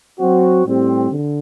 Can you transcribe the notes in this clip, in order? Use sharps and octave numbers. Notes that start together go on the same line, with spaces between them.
F#3 C4 F#4
A2 G3 C4 G4
D3